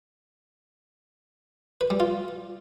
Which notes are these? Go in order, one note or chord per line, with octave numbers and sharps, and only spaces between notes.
B4
G3
F4